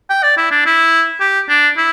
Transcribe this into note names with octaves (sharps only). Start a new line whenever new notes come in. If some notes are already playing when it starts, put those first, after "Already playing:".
G5
D5
E4
D4
E4
G4
D4
E4